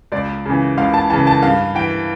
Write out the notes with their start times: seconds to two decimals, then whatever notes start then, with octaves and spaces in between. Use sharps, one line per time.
0.12 C#2 D5
0.46 C#3 E3
0.77 C#2 F5
0.94 A5
1.10 C#3 E3 A5
1.27 A5
1.43 G2 F5
1.75 E3 G5